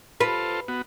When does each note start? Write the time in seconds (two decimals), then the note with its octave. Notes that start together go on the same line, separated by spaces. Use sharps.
0.20 F4 A4 B4 C5
0.68 B3 F#4